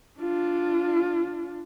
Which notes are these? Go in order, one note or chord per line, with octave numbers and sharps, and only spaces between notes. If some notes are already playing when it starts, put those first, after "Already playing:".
D4 F4